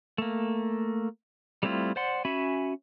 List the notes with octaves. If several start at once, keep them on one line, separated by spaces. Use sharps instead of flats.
A3 A#3
G3 A3 C4 E4 F4
C5 D5 F#5 C6
C#4 F#4 E5 G#5 B5